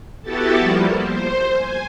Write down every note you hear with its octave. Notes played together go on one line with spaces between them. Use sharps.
B3 E4 F#4 G4 A4 A5
F3 G3 A#3
C5
G#5